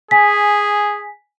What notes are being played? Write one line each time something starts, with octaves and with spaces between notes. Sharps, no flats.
G#4 G#5 B6